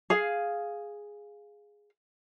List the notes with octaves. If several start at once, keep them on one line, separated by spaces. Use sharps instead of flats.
G#4 F5